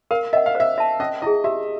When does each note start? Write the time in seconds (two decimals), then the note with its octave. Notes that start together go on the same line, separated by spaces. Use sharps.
0.11 A#4 F5
0.33 D#5 E5 F#5
0.46 F5
0.55 C5 E5
0.78 E5 A5
1.00 C#4 D#5
1.22 E4 G#4 D#5
1.44 G4 E5